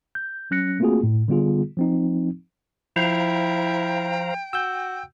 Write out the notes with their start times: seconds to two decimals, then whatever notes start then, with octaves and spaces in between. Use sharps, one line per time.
0.15 G6
0.51 F#3 C#4 F#6 A#6 C#7
0.80 A3 A#3 C4 F4 F#4 G#4
1.03 A2
1.28 D3 G3 B3 F4 G#4
1.77 F3 C4 D#4
2.96 F3 E4 C5 F5 G5 A#5
4.53 F#4 E6 G6